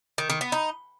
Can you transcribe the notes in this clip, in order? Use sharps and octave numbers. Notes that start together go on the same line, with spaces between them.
D#3
D#3
B3
D#4